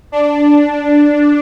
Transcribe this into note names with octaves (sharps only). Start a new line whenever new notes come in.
D4